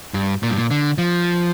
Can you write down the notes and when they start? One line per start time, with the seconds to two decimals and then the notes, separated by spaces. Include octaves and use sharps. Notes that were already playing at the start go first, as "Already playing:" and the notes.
0.14 G2
0.43 A#2
0.50 G2
0.57 A#2
0.71 D3
0.98 F3